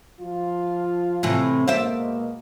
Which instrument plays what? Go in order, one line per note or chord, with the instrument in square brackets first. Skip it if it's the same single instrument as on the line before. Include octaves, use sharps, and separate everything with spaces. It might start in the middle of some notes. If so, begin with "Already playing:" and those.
[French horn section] F3 F4
[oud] A2 C3 E3
[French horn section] B2 G#3 A#3 [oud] C5 D5 E5